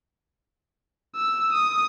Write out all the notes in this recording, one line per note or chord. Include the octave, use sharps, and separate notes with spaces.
E6
D#6